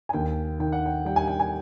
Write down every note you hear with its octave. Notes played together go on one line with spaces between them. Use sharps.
G#5
D#2 G5
D#3 G5
F#5
G5
G3 G5
G#5
G5
G#5